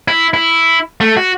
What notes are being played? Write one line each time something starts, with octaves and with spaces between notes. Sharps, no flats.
E4
E4
A3
F#4